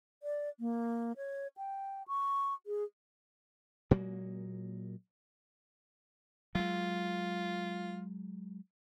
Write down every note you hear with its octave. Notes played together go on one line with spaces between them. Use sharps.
D5
A#3
C#5
G5
C#6
G#4
A#2 F#3 G#3 A#3
F#3 G#3 F4